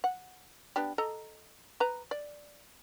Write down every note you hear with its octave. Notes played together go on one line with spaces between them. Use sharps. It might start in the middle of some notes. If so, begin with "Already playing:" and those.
F#5
B3 D4 G4
A4 D#5 A#5
B4 A#5
D5